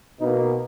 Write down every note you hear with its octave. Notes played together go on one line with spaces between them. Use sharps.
B2 A#3 D#4